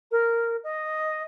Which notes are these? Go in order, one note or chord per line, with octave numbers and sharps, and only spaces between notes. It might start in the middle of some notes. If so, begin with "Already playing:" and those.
A#4
D#5